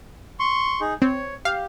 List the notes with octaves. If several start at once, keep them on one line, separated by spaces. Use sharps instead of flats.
C6 C#6
D#4 G#4
C4 C#5
G4 F5